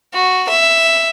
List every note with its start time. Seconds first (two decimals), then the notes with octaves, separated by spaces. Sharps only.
0.14 F#4
0.50 E5